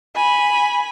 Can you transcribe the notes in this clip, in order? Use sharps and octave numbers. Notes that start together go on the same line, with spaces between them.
G#5 B5